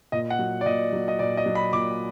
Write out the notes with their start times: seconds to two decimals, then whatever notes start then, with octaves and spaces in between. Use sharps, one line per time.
0.12 A#2 D#5
0.30 F#5
0.39 F#3
0.61 D5
0.65 A#2 D#5
0.93 F#3
1.08 D#5
1.19 A#2 D5
1.37 D#5
1.46 F#3
1.55 B5
1.73 A#2 D6